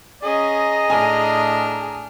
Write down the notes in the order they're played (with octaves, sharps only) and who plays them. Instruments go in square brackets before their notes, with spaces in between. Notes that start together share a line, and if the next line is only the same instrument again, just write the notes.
[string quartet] C#4 [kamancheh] G#4 A#5 [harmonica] D#5
[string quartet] A2 D4 F6 [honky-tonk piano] G#5